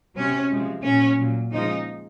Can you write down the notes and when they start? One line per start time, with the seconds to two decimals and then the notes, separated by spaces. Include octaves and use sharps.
0.16 C3 F#3 C#4
0.50 C3 F3 G#3
0.84 A#2 F#3 C#4
1.18 A#2 F#3
1.51 C#3 F3 G#3 D#4